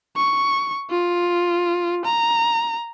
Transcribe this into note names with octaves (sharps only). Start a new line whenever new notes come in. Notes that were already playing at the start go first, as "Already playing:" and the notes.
C#6
F4
A#5